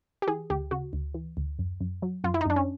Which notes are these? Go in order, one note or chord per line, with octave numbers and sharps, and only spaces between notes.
G4
E3 G#4
D2 G4
C#3 F#4
D2
E3
D2
F#2
F#2
F#3
F#2 F4
E4
D#4
F#2 D4
C#4